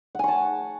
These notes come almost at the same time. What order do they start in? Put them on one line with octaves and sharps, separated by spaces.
F#5 G#5 C#6 A5